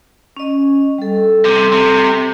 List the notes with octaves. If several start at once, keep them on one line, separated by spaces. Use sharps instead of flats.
C#4 D#5
G3 A4
C3
C3